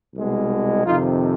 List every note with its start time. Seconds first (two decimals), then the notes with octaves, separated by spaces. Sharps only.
0.15 C2 B2 G#3
0.86 F2 C3 D#3 D#4 F4